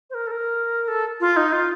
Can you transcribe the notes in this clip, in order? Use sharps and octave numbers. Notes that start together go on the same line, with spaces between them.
C5
A#4
A4
A#4
A4
F4
D#4
F4